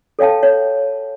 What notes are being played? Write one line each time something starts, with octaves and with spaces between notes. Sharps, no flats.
A4 C#5 F5 G5 A5
C#5